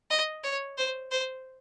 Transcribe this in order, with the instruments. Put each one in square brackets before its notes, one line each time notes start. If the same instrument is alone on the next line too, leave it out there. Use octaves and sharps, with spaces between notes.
[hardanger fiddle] D#5
C#5
C5
C5